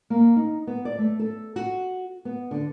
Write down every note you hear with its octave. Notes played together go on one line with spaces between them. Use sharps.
A#3
D#4
B3
D5
A3
A4
F#4
B3
D3